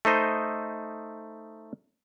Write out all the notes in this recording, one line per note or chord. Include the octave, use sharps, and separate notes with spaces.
A3 D#4 C5 D#5